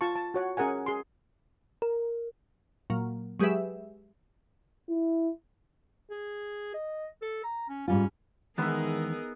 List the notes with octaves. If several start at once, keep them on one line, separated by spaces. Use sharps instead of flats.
F4 A5 C#6
A5
F#4 C#5 F#5
C#4 G#4 A#4 F#5 G#5
G#4 C6
A#4
A#2 F#3 A#3
F#3 G#3 G4 G#4 B4 E5
E4
G#4
D#5
A4
A#5
C#4
G#2 G3 C#4 F4
E2 D#3 G#3 B3 D#4 G#4 A#4 E5